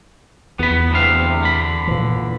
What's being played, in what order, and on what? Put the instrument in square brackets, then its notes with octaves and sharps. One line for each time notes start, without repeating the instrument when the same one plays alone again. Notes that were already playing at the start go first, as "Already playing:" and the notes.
[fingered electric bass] E2 [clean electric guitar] B3 B5
[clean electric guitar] D2 C3 F5
D3 B5
[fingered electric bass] A#2 E3